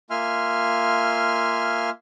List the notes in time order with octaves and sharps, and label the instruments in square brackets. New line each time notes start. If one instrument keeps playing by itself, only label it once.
[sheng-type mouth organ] A#3 F4 E5 G#5 C6 F6